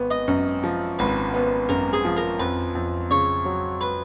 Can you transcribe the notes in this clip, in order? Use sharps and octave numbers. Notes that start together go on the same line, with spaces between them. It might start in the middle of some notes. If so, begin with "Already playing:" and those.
Already playing: G#1 B3
D#5
F#2
F3
G#1 B4
B3
F#2 A#4
G#4
F3
A#4
F2 B4
F2
C#3 C#5
F#3
B4